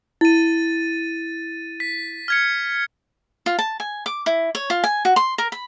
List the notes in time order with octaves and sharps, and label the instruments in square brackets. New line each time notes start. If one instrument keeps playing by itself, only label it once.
[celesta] E4 [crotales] A6 D#7
[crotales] B6
F6 G#6 C#7
[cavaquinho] F4
A5
G#5
D6
E4
C#5
F4
G#5
F#4
C6
A#4
B5